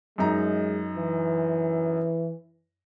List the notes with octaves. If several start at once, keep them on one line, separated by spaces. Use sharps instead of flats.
F#2 G#3 D#4 A#5
E3